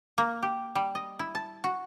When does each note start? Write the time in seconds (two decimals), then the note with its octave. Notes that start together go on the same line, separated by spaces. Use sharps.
0.18 A#3
0.43 G4
0.75 G3
0.95 D#5
1.19 E4
1.35 A5
1.64 F#4